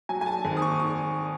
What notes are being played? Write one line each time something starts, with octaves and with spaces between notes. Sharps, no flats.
F#3 G#5
G#5
A5
G#1
D#6
C#6
D#6